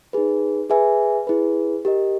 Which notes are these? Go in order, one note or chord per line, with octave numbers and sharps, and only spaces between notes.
D#4 G#4 B4
G#4 B4 E5 G#5
E4 G#4 B4
G4 A#4 D#5